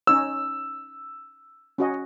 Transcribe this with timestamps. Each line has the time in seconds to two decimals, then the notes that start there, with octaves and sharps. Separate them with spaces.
0.07 C#4 D#4 C#5 E6
1.78 C#4 F#4 D#5